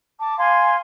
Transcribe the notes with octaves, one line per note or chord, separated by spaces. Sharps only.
A5 D6
F5 G#5 C6